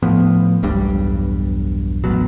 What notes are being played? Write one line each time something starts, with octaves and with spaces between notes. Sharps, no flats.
A2 F3 B3
E1 B1 G2 G3
A1 B2 F#3